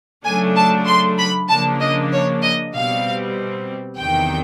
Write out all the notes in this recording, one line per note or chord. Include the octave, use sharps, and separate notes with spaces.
C#3 F#3 A3 D4 G#5
A5
C6
B5
C#3 F3 A#3 D4 A5
D#5
C#5
D#5
B2 G3 C4 F5
E2 C3 D#3 F#3 G5